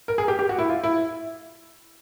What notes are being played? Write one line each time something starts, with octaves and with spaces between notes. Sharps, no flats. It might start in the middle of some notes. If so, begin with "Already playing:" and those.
A#4
G#4
G4
G4
F#4
E4
F4
E4